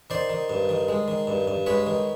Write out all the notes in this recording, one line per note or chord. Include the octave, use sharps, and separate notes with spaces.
D#3 C5 D5
D#3
G2
D#3
G#3
D#3
G2
G2
G#3 B4 C#5
D#3